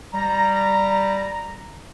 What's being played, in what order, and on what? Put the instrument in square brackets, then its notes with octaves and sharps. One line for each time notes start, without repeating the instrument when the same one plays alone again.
[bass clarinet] G3 [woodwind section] A#5